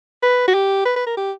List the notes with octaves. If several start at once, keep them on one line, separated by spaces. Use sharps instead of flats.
B4
F#4
G4
B4
B4
A#4
G4